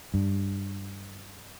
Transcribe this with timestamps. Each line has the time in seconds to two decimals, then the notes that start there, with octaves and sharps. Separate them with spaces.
0.14 G2